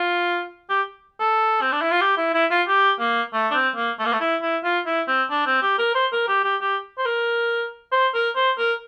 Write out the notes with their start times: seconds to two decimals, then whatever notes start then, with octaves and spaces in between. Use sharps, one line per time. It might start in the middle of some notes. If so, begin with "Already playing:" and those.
Already playing: F4
0.70 G4
1.20 A4
1.62 C4
1.72 D4
1.81 E4
1.91 F4
2.01 G4
2.17 E4
2.34 E4
2.51 F4
2.68 G4
2.99 A#3
3.33 A3
3.51 D4
3.54 C4
3.76 A#3
3.99 A3
4.05 A#3
4.13 A3
4.20 E4
4.42 E4
4.64 F4
4.86 E4
5.08 C4
5.30 D4
5.46 C4
5.62 G4
5.78 A#4
5.95 C5
6.12 A#4
6.28 G4
6.44 G4
6.61 G4
6.98 C5
7.05 A#4
7.92 C5
8.14 A#4
8.36 C5
8.58 A#4